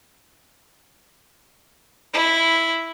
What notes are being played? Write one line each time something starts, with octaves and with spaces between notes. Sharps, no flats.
E4